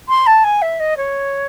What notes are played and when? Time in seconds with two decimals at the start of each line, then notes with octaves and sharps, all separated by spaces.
0.09 C6
0.27 A5
0.44 G#5
0.62 E5
0.80 D#5
0.97 C#5